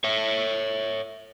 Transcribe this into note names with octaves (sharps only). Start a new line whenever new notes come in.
C#5 E5